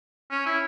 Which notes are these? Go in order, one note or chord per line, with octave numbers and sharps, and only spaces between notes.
C#4
E4